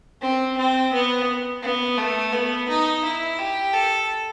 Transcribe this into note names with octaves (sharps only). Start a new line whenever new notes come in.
C4
C4
B3
B3
A3
B3
D#4
E4
G4
A4